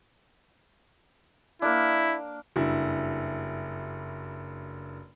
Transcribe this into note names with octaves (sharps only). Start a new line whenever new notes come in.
A#3 D4 E4
F#1 G2 E4